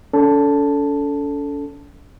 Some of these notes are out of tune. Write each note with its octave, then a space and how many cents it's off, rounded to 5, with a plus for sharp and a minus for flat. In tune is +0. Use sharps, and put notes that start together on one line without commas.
C#4 +45 A4 +0 A5 +0